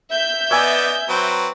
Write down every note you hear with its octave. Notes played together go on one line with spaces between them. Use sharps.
E5 G6
B3 D5 D#5 G#5 E6 G#6
F#3 C4 B4